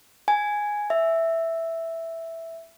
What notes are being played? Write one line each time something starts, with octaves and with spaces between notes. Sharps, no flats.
G#5
E5